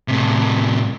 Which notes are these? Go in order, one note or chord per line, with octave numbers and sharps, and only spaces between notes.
A2 C3